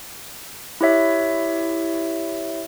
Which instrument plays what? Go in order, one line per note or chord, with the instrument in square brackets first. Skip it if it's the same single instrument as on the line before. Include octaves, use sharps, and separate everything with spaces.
[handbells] E4 G4 C#5 E5